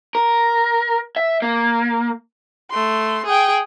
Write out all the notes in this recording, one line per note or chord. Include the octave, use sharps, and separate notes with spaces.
A#4
E5
A#3
A3 C6
G#4 G5